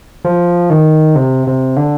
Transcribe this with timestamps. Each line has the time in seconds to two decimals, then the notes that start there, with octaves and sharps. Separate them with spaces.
0.25 F3
0.70 D#3
1.15 C3
1.47 C3
1.77 D3